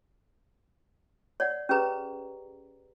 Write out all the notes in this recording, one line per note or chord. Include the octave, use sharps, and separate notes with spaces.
C#5 D5 F#5
C#4 G4 G#4 B4 A#5